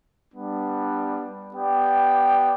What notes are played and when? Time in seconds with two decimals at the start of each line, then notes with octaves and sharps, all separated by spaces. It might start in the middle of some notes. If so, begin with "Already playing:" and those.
0.32 G3 B3 D4
1.54 B3 G4 D5 G5